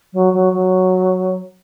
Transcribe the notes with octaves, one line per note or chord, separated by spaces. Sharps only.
F#3
F#3
F#3